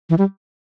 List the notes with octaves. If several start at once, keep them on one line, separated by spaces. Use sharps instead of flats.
E3
G3